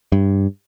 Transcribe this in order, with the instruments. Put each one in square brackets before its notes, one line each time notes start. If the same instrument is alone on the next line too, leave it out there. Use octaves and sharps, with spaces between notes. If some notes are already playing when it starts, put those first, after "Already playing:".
[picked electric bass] G2